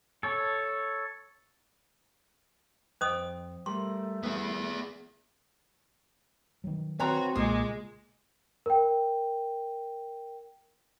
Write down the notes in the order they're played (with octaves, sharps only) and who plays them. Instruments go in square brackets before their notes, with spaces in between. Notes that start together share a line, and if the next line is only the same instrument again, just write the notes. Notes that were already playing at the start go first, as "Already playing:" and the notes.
[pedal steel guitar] A4 C#5
[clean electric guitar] F2 G5 [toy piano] C5 D#5 D#6
[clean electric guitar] G3 A#4 [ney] A3 [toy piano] C6
[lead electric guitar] B3 G#4
[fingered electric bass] D#3 F#3
[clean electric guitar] C4 [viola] F#4 [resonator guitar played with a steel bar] B4 C#5 A#5
[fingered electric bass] B1 C#3 [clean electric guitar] A#2 [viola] G#3 [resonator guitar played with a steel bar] G#4
[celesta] A#4 G5